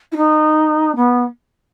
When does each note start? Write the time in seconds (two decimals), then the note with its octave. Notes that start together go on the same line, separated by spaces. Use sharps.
0.12 E4
0.16 D#4
0.96 B3